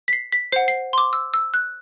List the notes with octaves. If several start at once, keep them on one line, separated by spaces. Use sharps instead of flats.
B6
C7
B6
C5 F#5 C7
C7
C6
D6
E6
E6
F#6